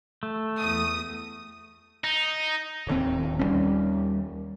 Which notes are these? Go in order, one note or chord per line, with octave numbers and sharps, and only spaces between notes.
A3
E2 D#6
D#4
D1 D#2 C4
D#2 G3 C#4